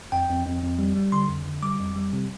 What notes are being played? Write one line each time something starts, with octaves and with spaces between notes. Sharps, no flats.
F2 G5
F2
F2
F2
G3
G3
D3 C6
F2
D3
G3 D6
F2
G3
C3